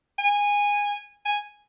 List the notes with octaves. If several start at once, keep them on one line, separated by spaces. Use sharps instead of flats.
G#5
G#5